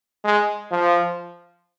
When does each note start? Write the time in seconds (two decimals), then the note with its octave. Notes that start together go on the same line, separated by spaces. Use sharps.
0.25 G#3
0.72 F3